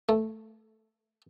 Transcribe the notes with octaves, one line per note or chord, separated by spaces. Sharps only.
A3